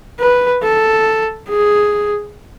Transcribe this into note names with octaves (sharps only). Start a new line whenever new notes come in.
B4
A4
G#4